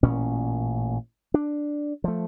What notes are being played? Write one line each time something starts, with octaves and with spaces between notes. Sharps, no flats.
A1 A#2 C#4
D4
F3 A3